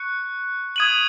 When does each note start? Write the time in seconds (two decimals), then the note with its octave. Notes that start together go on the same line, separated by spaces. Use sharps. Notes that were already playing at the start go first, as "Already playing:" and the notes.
Already playing: C#6 F#6 C#7
0.76 D#6 G#6 D#7 F#7